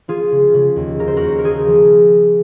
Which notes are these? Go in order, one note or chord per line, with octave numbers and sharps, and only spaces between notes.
F3 F4 G#4
C#3
C#3
D#2
C#3 A#4
C5
F#4 A#4
D#2
A#4
F3 G#4 C5
F3